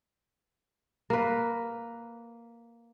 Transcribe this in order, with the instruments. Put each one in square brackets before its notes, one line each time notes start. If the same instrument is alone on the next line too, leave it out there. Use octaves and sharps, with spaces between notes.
[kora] A#3 B4